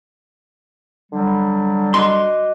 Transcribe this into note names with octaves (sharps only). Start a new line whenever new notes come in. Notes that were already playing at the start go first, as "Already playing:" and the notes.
D3 F#3 G3
F#4 D#5 C6 D6